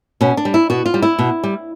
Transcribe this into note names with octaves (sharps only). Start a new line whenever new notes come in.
B2 C#4
D4
G3
E4
B2 F#4
F4
G3
E4
B2
G3